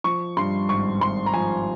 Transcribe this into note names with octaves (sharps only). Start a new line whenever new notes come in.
F3 C#6
G2 C6
G#1 C#6
G#1 C6
A#5
F3 G#5